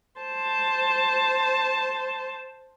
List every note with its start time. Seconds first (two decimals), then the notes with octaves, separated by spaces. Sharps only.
0.21 C5 A5